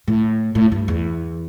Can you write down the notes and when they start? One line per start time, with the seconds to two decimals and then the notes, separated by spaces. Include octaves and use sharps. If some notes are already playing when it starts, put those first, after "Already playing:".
0.08 A2
0.55 A2
0.72 G2
0.88 E2